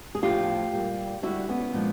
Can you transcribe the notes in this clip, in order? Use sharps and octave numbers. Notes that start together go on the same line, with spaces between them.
G#4
A2 F3 A3 F4 G4
A#2 G3
D3 G3 E4 F#4
B3 C#4
A#2 F3 G#3